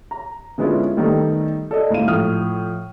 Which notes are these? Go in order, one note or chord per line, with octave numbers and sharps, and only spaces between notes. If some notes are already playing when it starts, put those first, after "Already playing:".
A#5
D3 G#3 B3 C#4 E4 F4
D#3 G3 A3 B3 D#4
A4 D5 D#5
D2 G#2 E4 F5 D#7
A2 F3 D#6 F6